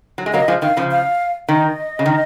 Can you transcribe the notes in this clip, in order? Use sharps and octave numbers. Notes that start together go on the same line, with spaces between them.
F#3
G#3
F#3 A#3 D#5
F3 G#3
D#3 F5
C#3 F3
F5
D#3 D#5
C#3
D#3